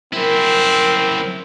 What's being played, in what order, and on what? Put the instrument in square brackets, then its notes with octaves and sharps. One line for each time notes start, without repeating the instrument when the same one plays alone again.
[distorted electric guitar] F#2 E4 [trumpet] C4 [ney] A#4